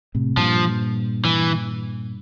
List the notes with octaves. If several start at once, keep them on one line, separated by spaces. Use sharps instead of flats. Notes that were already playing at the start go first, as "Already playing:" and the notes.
A2 C3
G2 A#2 F3
E3